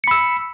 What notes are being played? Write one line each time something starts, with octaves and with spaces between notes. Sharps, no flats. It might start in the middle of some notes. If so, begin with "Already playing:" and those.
B5 E6 C#7